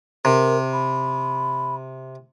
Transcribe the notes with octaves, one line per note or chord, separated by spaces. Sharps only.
C3 A#4
B5